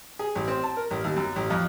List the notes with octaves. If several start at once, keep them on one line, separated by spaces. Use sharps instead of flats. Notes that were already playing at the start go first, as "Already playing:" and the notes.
G#4
A1
C4
A5
A#4
A1
D#2
F#2
A1
F2